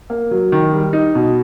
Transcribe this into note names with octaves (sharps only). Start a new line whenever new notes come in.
A#3
F#3
D#3
G3
D#4
B2